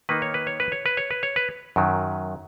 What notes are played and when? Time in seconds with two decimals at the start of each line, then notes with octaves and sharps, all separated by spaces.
0.09 D#3 A#3 D#4 B4
0.22 C#5
0.34 B4
0.47 C#5
0.60 B4
0.72 C#5
0.86 B4
0.97 C#5
1.11 B4
1.23 C#5
1.36 B4
1.76 F#2 D#3 F#3